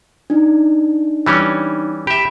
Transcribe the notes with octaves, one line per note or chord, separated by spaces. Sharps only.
D4 D#4
E3 G3 C#4
G4 E5 B5